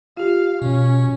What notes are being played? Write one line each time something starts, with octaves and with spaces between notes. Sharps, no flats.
F4 G4 F5
B2 C#4